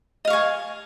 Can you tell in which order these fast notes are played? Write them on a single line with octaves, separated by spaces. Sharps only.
D#5 F5 C#6 G#5